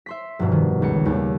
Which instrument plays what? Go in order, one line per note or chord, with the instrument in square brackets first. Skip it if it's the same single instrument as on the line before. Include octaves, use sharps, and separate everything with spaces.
[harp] E5 C6 B6
F1 G2 B2
D#3
C#2 C#7
D#2 C#3 G3